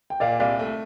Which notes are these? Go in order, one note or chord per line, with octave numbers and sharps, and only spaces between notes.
G5
A#2 D5 F5
C2 D5 F5
A3